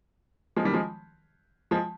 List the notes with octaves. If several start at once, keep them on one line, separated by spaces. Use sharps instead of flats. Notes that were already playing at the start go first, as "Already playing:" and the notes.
F3 G#3
D#3 G3
F3 G#3
F3 G#3